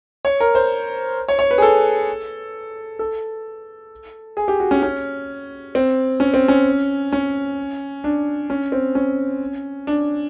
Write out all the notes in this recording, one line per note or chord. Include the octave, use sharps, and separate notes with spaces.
C#5
A#4
C5
C#5
C#5
B4
G#4
A4
A4
G#4
G4
F#4
C#4
C#4
C4
C#4
C4
C#4
C#4
D4
C#4
C4
C#4
D4